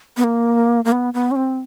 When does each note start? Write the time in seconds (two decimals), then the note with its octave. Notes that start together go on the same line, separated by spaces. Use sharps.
0.17 B3
0.24 A#3
0.85 A#3
0.92 B3
1.14 B3
1.31 C#4
1.36 C4